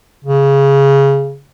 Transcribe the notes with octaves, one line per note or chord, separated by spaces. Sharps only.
C#3